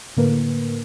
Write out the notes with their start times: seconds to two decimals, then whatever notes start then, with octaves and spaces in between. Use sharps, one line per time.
0.17 A2 D3 A#3 A#4 B4